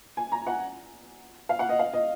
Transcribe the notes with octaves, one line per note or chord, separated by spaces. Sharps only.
G#5
A#5
F#5
F5
F#5
D#5
F5
D#5